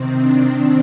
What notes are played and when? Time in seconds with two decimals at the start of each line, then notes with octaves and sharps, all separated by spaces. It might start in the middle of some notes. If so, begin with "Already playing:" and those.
Already playing: C3 D#3 C4
0.18 D4
0.48 C4